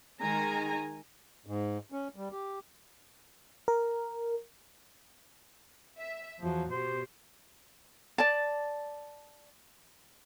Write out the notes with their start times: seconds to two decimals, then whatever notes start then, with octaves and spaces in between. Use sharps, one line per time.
0.20 D#3 G#3 G#5 A#5
1.46 G#2
1.92 C#4
2.16 G3
2.32 G4
3.68 A#4
5.98 E5
6.41 E2 F3 F#3
6.71 B2 G4 C5
8.18 D5 A5